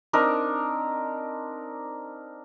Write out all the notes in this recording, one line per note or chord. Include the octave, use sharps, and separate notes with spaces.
C4 D4 D#4 A#4